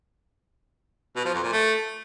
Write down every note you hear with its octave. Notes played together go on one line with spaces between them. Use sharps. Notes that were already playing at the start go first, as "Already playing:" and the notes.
B2
F3
F2
A#2
A3